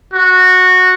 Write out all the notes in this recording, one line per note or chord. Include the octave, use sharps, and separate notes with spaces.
F#4